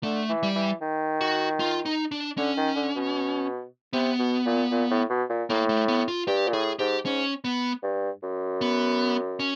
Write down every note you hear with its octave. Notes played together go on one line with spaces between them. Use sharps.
D3 A3
E3
G3
E3
D#3
F#4
F4
D#4
D4
D3 C#4
D#3
D3
B2
C3 B3
B2
A#2
A#2
A2
B2
A#2
A2 A#3
A3
B3
F4
G2 G4
A#2
A2 G#4
G#2 G4
G#2 C#4
B3
G2
F#2
B3
C#4